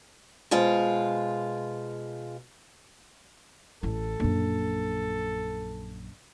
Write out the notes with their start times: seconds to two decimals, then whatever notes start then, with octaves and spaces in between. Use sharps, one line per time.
0.51 B2 G#3 F4 C5
3.83 A1 E4 A4
4.20 A#1 F#2